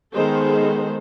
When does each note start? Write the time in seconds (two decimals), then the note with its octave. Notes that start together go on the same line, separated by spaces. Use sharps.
0.15 D#3 G#3 B3 A4 C5